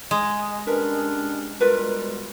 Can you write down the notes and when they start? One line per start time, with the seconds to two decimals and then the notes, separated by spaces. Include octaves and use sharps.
0.11 G#3
0.67 G3 C#4 D4 A#4 B4
1.60 B2 G3 G#3 F4 A#4 B4